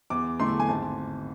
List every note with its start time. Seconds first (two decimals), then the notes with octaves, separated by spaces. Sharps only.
0.10 E2 D6
0.39 D3 A3 E4 C6
0.60 G#5
0.68 G#1 A5